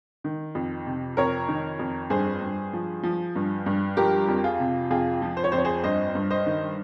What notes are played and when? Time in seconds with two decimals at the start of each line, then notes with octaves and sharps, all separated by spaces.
0.24 D#3
0.55 F2
0.87 C3
1.17 F2 A#4 C#5
1.48 D#3
1.79 F2
2.10 G2 G#4 C5
2.42 G2
2.73 F3
3.03 F3
3.36 G2
3.66 G2
3.97 F3 G4 A#4
4.28 F2
4.44 F4 G#4
4.60 C3
4.90 F2 F4 G#4
5.22 F3
5.37 C5
5.44 C#5
5.52 F2 C5
5.58 C#5
5.65 G#4 C5
5.83 G2 C5 D#5
6.15 G2
6.30 C5 D#5
6.46 D#3